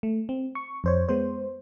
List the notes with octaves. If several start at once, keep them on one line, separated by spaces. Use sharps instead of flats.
A3
C4
C#6
F2 C5 C#5
G#3 B3 C5